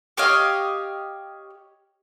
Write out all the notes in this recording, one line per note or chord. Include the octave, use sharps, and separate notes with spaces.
G4 C#5 D#5 F5